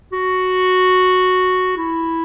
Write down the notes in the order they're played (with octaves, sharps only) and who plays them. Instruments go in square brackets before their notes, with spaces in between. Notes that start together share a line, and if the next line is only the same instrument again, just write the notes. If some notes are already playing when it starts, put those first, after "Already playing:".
[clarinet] F#4
E4